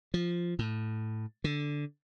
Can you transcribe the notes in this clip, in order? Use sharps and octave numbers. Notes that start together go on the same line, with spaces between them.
F3
A2
D3